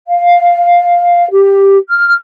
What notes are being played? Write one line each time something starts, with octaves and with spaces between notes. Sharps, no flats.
F5
G4
F6